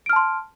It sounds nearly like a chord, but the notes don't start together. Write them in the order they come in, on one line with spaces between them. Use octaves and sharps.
D7 F6 A5 C6